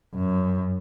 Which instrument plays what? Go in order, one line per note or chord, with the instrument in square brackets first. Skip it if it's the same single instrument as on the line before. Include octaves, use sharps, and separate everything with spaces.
[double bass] F#2